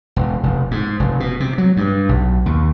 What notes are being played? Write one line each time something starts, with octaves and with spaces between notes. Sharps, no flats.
E1
F1
G#2
F1
B2
C3
F#3
G2
B1
D#2